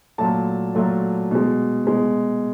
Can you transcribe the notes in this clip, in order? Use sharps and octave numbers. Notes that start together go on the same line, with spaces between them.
A#2 F#3 A3 A5
A#2 F#3 A3
B2 G#3
B2 G#3